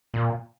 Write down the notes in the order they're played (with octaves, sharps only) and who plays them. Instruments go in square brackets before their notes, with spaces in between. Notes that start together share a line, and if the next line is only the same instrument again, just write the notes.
[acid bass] A#2